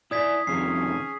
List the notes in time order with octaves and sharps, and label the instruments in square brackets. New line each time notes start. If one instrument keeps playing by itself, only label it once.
[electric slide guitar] E4 D5 [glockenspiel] D#6 G#6 B6
[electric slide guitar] F2 C3 D#3 [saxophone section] C#4 G#4 [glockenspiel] C7